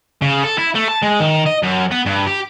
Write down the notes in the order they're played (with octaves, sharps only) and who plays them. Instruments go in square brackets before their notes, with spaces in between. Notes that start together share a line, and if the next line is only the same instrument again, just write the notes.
[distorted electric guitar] C#3
A4
E4
A3
A5
G#3
D#3
D#5
F#2
B3
G2
G4